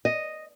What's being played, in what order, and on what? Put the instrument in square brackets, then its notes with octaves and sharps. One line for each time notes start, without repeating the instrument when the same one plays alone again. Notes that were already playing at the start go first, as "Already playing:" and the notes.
[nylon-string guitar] D#5